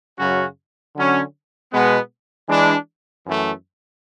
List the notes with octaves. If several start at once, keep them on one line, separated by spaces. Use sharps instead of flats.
F#2 C#3 F#3 C#4 F#4
D3 F#3 C#4
B2 G#3 B3
E3 G#3 D4
F#2 E3 A3